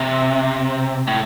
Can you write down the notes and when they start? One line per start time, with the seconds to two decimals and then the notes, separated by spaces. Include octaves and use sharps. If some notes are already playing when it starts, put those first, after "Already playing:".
Already playing: C3
1.08 A2